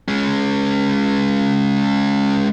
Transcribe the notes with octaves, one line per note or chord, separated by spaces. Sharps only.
G#3 C#4